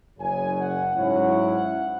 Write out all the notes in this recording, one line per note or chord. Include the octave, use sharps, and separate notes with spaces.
F#1 F#2 C#3 G#5
F#5
G#2 F#3 C#4 E4 F#5